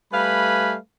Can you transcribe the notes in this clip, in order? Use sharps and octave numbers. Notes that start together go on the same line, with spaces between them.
G3 A3 B4 F5 G#5 B5